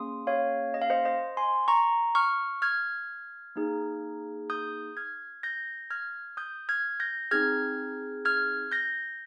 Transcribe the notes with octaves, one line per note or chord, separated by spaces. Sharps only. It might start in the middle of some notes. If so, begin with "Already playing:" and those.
Already playing: A#3 C#4 G#4 C6 D#6
C#5 F5
D#5
F5
C5 D#5
C5 D#5
G#5 C6
A#5 C#6
C#6 F6
F6 G#6
A#3 D#4 G#4
D#6 G6
F6 G#6
G6 A#6
F6 G#6
D#6 G6
F6 G#6
G6 A#6
C4 D#4 G#4 F6 G#6
F6 G#6
G6 A#6